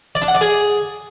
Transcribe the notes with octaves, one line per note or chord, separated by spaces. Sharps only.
D5
D4
F#5
D5
G#4